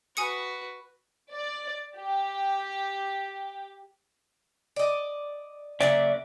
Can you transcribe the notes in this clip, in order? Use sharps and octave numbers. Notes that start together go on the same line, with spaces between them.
F#4 B4 G#5 D#6 C#7
D5
G4
D5 D#5
C#3 F#3 A#3 D5 E5